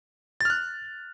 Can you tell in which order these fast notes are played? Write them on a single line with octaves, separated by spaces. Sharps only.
A6 F6 F#6